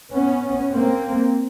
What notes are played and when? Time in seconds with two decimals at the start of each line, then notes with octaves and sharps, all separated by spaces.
0.12 B3 C#4
0.73 A#3 C4